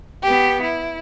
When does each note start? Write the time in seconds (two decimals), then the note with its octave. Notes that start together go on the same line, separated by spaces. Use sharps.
0.22 B3 G4
0.62 E4